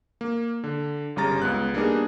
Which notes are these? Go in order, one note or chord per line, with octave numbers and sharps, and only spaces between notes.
A#3
D3
G1 C#3 G3 A#5 A6
C#2 B3 F#6
G3 A#3 B3 D4 D#4 G#4